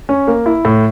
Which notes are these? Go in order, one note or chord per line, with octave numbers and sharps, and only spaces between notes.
C#4
A#3
E4
A2